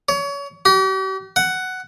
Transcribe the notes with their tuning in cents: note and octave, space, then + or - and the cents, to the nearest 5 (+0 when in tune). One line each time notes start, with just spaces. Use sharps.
C#5 +30
G4 -45
F#5 +10